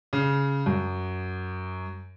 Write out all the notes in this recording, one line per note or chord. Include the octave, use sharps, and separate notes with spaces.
C#3
F#2